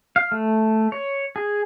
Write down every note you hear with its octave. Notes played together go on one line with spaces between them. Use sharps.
F5
A3
C#5
G#4